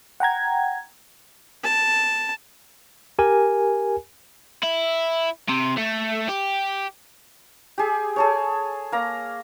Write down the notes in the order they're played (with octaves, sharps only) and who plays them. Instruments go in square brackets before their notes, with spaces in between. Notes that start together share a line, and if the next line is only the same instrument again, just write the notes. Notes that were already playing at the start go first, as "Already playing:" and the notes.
[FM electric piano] F#5 G5 A#5 G#6
[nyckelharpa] A5
[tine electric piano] G4 A#4 G#5
[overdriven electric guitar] E4
C3
A3
G4
[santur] G4 G#4
G#4 A4 C#5
A#3 F5 A#5